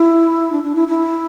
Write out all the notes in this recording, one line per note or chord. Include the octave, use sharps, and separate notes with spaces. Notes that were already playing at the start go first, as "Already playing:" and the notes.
Already playing: E4
D4
D4
E4
E4